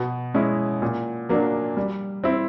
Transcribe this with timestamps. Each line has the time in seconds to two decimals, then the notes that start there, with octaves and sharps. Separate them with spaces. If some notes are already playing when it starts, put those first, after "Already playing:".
Already playing: B2
0.34 G#3 C#4 E4
0.82 A#2
1.29 F#3 A#3 D4
1.77 G3
2.24 C4 E4